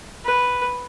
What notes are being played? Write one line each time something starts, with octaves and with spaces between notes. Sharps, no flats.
B4